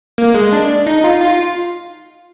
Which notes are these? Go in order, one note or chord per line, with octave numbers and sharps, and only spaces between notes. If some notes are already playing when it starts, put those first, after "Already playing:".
A#3
G#3
D4
D#4
F4
F4